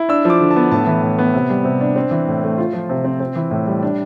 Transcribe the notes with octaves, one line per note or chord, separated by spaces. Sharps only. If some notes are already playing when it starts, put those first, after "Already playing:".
Already playing: E4
D4 E6
F3
D6
D3
A5
B3
A2 A5
E3
A2
B3
C3
G3
C3
D4
C4
E3
A2
A3
F4
F3
C3
C4
C4
E3
A2
G3
D4